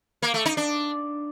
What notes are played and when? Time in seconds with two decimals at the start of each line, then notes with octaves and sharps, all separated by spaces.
0.22 A#3
0.34 A3
0.46 D#4
0.57 D4